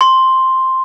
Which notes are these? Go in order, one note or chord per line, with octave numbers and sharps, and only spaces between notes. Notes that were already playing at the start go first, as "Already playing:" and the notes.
C6